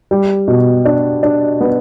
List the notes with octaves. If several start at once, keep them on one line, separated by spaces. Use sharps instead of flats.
G3
B2
D4
D4
B3